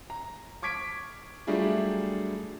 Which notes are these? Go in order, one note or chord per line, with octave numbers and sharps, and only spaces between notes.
A#5
C#6 D6 G#6 B6 D7
F#3 G3 A3 D4 F4 G#4